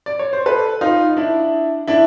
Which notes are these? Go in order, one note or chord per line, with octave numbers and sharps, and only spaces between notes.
D5
C#5
C5
A4 B4
D#4 F4
D4 E4
D4 E4